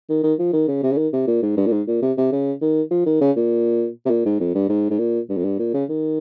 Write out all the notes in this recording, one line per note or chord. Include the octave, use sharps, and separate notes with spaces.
D#3
D#3
F3
D#3
C#3
C3
C#3
D#3
C3
A#2
G#2
G2
A#2
G#2
A#2
C3
C3
C#3
D#3
F3
D#3
C#3
A#2
C3
A#2
G#2
F2
G2
G#2
G#2
A#2
G2
F2
G2
A#2
C#3
D#3